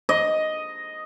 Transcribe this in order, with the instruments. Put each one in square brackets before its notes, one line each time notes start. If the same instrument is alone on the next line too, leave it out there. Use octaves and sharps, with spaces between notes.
[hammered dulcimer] D#5